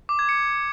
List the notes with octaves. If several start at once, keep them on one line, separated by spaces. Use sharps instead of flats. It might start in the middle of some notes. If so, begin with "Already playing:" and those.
D6
G#6
C#7